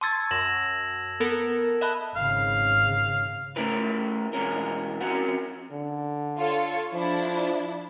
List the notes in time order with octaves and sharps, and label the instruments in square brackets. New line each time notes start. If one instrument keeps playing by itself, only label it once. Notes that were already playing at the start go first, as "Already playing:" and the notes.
[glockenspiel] A5 E6 G#6 [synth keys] C6 C#6 A6
[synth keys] F#2 [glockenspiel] A#6 E7 F#7
[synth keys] B3 A4 A#4
[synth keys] D#5 E5 F#6 [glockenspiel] A5 B5 E7
[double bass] G#1 C#3 [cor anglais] F5
[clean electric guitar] A3 C#4 E4 A#4 B4
B2 E3 G#3 C#4 A#4
F2 C#4 F#4 A#4 F#5
[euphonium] D3
[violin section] F4 A4 C#5
[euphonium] F3 [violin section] D4 E4